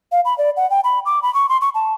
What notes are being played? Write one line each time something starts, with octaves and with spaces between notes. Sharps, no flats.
F5
B5
D5
F#5
G5
B5
D6
B5
C#6
C6
C#6
A5